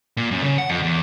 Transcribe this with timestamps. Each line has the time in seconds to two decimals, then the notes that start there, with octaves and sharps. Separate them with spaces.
0.17 A#2
0.31 F#2
0.43 C#3
0.58 F#5
0.70 F2
0.83 E2